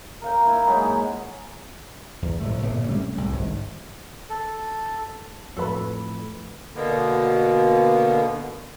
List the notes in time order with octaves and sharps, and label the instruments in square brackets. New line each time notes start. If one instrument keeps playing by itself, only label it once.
[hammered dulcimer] A#4 F5 G5
A#3 E4
G#2 F#3 G#3
[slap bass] E2
F1 A2 C3 A3
G1 A#2 C#3
C3 G3 A3 C#4
C2 A2
G#1 G2
[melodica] A4
[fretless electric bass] F2 A2 [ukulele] A4 B4 B5
[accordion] B2 D3 A#3 B3